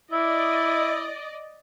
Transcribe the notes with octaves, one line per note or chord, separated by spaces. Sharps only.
E4 D5 D#5